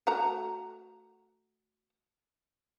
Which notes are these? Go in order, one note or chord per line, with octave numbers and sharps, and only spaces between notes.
A3 F#4 A#5